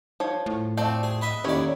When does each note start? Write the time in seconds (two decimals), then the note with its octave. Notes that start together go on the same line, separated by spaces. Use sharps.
0.20 F3 C#5
0.46 A2
0.77 F3 A3 C4 D5
1.03 G#4
1.21 B4 D#5 E5
1.44 D#2 A2 D#3 C#4 E4 C#5 D5